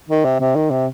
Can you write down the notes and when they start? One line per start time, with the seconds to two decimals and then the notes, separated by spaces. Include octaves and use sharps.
0.09 D#3
0.25 C3
0.40 C3
0.56 D#3
0.70 C3